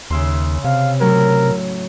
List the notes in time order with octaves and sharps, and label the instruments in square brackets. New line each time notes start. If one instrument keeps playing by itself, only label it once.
[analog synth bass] D#2 [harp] C#3 E5 C6
[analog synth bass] C3 [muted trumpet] F5
[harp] A2 F#3 [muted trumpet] A#4